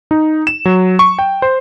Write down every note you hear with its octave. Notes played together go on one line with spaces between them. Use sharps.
D#4
E7
F#3
C#6
G5
C5